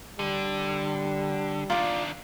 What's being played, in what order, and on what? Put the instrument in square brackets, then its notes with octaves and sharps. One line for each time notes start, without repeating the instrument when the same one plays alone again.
[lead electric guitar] D3 [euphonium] G3
[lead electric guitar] D#3 D4 [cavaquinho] F4 D5